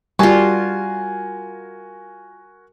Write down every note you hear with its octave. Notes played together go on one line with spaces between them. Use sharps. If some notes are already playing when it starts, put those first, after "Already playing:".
G3 F4 F#4 A#4 G#5 A5